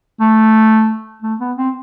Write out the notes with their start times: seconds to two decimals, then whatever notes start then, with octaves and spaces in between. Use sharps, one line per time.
0.21 A3
1.22 A3
1.40 B3
1.57 C4